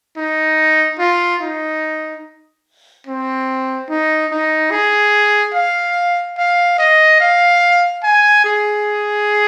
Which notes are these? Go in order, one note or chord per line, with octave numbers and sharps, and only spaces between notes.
D#4
F4
D#4
C4
D#4
D#4
G#4
F5
F5
D#5
F5
G#5
G#4